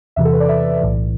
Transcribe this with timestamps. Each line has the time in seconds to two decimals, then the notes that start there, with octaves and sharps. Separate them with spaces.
0.16 E2 C3 E3 E5
0.25 A4
0.33 B4
0.40 D5
0.49 E5
0.81 B1 A2 E3